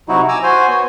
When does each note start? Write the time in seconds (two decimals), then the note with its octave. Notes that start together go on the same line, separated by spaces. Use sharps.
0.09 C3 F#3 D#4 E4 F#4
0.28 G#5 A#5 D6 E6
0.43 F#4 C5 G#5
0.69 B3 C#5